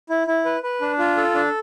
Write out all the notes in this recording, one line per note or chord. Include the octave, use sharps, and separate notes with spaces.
E4
E4
B4
B4
D4
F4
A4
D4